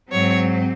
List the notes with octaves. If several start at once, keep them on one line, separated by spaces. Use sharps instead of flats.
G#2 F#3 C4 C#5